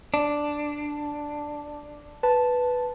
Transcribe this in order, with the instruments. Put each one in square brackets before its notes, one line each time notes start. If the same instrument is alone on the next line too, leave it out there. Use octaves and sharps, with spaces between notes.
[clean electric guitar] D4
[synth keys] B4 A5